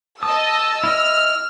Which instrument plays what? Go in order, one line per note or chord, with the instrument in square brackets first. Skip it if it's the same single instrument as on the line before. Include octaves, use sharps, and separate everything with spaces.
[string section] D#5 A5 [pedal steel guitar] D#6 [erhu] E6
[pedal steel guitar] E4 D#5 [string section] F6